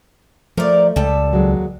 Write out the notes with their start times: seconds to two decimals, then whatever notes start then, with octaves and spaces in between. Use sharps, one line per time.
0.57 F3 A3 A#4 D5
0.96 C#2 G3 A4
1.31 D#2 F#3 G#3